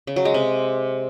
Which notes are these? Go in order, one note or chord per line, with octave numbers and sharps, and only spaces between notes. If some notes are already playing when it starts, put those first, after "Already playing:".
C#3
F#3
G#3
C3